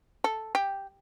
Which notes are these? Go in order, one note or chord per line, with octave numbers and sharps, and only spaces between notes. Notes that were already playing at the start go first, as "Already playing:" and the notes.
A4
G4